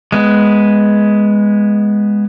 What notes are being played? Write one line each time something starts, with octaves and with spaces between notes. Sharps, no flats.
G#3 B3